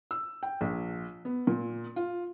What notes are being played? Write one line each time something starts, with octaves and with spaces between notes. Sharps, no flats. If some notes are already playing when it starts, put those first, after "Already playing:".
E6
G5
A#1
B3
A#2
F4